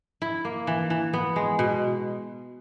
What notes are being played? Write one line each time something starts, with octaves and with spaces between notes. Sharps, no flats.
E4
A#3
E3
E3
B3
G#3
B2